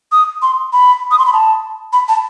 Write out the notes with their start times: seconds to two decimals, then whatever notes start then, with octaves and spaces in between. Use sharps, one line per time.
0.12 D#6
0.42 C6
0.73 B5
1.11 D#6
1.18 C6
1.26 B5
1.33 A5
1.93 B5
2.08 A5